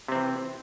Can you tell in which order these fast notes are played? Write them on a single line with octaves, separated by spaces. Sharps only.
C3 C4 E3